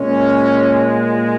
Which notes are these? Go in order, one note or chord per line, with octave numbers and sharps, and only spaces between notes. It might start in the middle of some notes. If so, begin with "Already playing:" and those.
Already playing: A#2 G#3 C#4